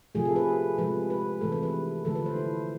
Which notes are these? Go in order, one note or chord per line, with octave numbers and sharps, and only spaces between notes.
C3 F3 A3 G#4
A4
B4
C3 F3 G#3 B4
B4
C3 E3 A3 A4
B4
B4
D3 F3 A3 A4
B4
C5
E4